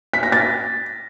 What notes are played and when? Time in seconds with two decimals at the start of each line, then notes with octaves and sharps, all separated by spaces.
0.13 B6
0.23 A#6
0.32 A6